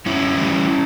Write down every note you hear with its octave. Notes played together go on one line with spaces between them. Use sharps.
F#2 C#4 E4
E3 G3